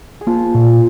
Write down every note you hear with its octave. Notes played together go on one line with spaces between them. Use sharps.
G#4
F3 A#3 F4
A#2